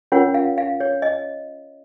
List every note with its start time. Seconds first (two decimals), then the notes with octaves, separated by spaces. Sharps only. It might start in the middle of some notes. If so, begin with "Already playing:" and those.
0.12 C#4 F4 A#4 C#5 F#5
0.34 F5
0.58 F5
0.80 C#5
1.02 D#5